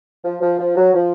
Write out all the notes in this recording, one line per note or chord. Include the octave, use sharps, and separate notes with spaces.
F3
F3
F3
F#3
F3